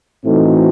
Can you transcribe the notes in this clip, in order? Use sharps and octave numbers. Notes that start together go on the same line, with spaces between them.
A2 E3 A3 C4 D#4 F#4